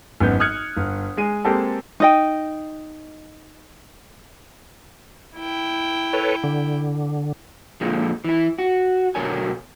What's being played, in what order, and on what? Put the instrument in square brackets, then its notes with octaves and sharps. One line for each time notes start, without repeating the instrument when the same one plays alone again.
[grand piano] G#1 F#2 B3 G6
D#6 F6 F#6 G#6 C#7
G1
G#3 G#4 D#7
G#3 A#3 C4 G4 A4 A5
[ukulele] D#4 D#5 G5
[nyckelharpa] E4 G5
[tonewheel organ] A4 B4 C#5
D3
[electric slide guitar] A#2 D3 F3 G#3
E3 E4
F#4
B2 D3 F#3 A#4 C#5 G#5